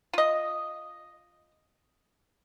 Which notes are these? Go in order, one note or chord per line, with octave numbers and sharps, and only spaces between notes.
F4 D#5